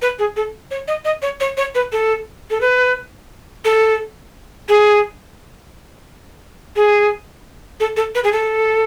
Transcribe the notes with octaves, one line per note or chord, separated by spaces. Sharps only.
B4
G#4
A4
C#5
D#5
D#5
C#5
C#5
C#5
B4
A4
A4
B4
A4
G#4
G#4
A4
A4
B4
G#4
A4